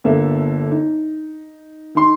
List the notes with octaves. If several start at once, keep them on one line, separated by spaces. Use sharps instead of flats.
G1 A#3 B3 A4 E5
D#4
D#3 D#4 C6